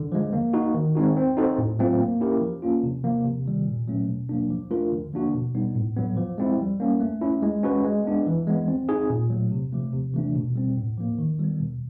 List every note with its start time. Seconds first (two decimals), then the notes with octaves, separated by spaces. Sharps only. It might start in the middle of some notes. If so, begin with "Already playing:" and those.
Already playing: D3
0.12 F3 G#3
0.33 A#3
0.53 D#4 F#4
0.74 D#3
0.95 G#3 C4 D#4 F#4
1.16 C4
1.37 D#4 F#4 A4 C5
1.58 A2
1.79 F#3 A3 C4 F4
2.00 A#3
2.21 C#4 E4 G4 A#4
2.41 F3
2.62 A#3 C#4 F4
2.83 C3
3.04 F3 A#3
3.25 C3
3.46 D#3 G3
3.67 A#2
3.88 F#3 A3 C#4
4.08 B2
4.29 F#3 A#3 D4
4.50 F3
4.71 A3 D4 F4 A#4
4.92 D3
5.13 F3 A#3 D4 F#4
5.34 B2
5.55 G3 B3 D#4
5.75 A2
5.96 F#3 B3
6.17 F3
6.38 G#3 C4 E4
6.59 G3
6.80 A#3 C#4
7.00 A3
7.21 C#4 E4
7.43 G#3
7.63 C#4 F#4 B4
7.84 G#3
8.05 B3 D4
8.26 E3
8.47 G#3 B3
8.68 C4
8.89 D#4 G#4
9.10 A#2
9.30 F#3 A3
9.52 C3
9.72 F3 A3
9.93 C3
10.14 E3 A3 D4
10.35 B2
10.56 G3 C4
10.77 A2
10.98 F3 A#3
11.18 D#3
11.39 G3 B3
11.60 B2